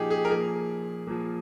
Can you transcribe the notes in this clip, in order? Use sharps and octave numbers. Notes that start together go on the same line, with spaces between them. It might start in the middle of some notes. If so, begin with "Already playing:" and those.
Already playing: A#2 F3 D#4 G4 G#4
G#4
A#4
A#2 F3 G#4
A#2 F3